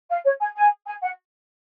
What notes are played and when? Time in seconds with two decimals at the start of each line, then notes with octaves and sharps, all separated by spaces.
0.09 F5
0.25 C#5
0.40 G#5
0.56 G#5
0.86 G#5
1.02 F#5